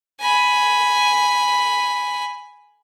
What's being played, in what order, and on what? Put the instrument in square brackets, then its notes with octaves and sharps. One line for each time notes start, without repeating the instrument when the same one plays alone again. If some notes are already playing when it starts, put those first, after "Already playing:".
[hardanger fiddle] G#5 B5